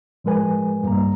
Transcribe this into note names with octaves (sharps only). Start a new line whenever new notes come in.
A2 F3 G#3 A#4 B4 G#5
G2 G3 A#3 A#5